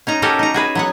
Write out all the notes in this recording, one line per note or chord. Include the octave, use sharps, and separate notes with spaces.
C#4 D#4 A#5
C#4 F#4 G4 A4 A#4
D#4 A#5
F#4 G#4 B4
F#3 B3 F#5